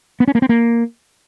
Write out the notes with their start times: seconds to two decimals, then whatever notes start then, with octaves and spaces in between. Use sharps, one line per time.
0.20 B3
0.28 C#4
0.35 A#3
0.42 C4
0.49 A#3